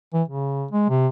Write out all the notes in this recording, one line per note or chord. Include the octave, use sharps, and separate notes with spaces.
E3
C#3
G#3
C3